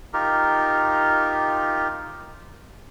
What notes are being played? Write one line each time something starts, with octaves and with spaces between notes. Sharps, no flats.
D#4 F4 G4 A#4